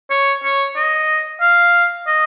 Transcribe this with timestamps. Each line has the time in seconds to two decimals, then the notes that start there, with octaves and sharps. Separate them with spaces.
0.10 C#5
0.44 C#5
0.76 D#5
1.41 F5
2.07 D#5